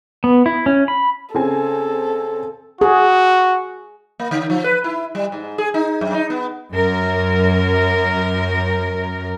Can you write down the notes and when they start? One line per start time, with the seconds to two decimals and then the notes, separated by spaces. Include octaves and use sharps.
0.24 B3
0.46 E4
0.66 C#4
0.88 B5
1.35 C#3 C4 A4 G#5
2.81 F#4 G#4
4.20 A#3
4.31 D3
4.50 F3
4.64 B4
4.84 E4
5.15 G3
5.32 G#2
5.58 G#4
5.74 D#4
6.01 F#2
6.14 D#4
6.30 B3
6.73 F#2 A#4